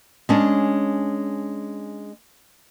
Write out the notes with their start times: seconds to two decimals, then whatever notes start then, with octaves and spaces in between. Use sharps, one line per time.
0.29 G#3 C#4 D4